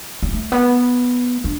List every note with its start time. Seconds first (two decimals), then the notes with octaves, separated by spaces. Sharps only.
0.23 B3
0.33 A3
0.52 B3
1.44 D4